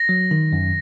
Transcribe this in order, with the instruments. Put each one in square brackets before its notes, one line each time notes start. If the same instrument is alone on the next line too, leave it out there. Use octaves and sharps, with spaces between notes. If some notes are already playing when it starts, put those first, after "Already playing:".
Already playing: [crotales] A#6
[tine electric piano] F#3
D#3
F#2